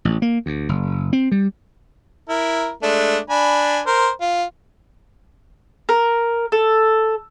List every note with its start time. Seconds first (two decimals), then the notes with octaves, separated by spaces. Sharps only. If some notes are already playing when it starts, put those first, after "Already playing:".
0.05 A1
0.22 A#3
0.46 D2
0.69 F#1
1.13 C4
1.32 G3
2.29 E4 A#4
2.83 G#3 A3 D4
3.30 D4 G#5 B5
3.86 A#4 C5
4.21 F4
5.89 A#4
6.52 A4